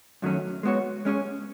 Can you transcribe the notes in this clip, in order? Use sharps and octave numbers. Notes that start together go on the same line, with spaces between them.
F#2 D#3 F#3 A3 C#4
G#3 B3 F#4 C#5
G#3 C#4 G#4 C#5